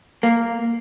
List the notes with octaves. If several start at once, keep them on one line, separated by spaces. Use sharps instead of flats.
A#3